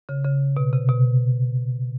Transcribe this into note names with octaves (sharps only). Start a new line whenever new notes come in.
C#3
C#3
B2
C3
B2